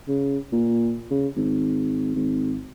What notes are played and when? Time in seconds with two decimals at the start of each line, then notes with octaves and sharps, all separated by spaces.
0.08 C#3
0.52 A#2
1.11 C#3
1.36 G#1
2.15 G#1